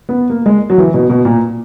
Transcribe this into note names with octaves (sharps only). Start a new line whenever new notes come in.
B3
A#3
G#3
F#3
E3
B2
B2
A#2